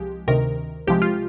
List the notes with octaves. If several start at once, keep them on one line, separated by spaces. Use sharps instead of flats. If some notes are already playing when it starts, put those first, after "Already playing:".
Already playing: C2 F3 G#3 G4
D2 C3 D#3 A#4
C2 C3 F3 G#3 G4
F4